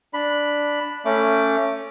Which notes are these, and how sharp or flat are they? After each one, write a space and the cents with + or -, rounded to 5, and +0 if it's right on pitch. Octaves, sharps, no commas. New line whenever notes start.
D4 +0 B5 +0
A3 +20 C#4 +0 D6 -5